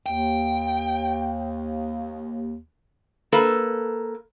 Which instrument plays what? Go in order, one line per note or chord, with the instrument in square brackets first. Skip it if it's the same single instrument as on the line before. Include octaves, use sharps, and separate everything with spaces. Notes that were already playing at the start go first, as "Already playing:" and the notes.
[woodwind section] D#2 [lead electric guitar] G5
[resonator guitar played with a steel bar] A#3 A4 B4